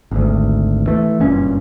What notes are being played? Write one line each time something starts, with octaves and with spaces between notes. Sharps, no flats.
G#1 D2
E3 A3
F#1 G2 A#2 C#4